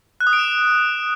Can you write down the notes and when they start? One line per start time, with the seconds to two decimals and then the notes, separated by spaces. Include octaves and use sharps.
0.20 F#6
0.27 D#6
0.33 D7
0.39 E7